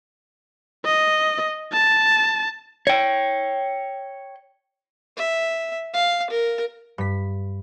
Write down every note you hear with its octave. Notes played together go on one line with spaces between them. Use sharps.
D#5
A5
C#5 G5
E5
F5
A#4
G2 B6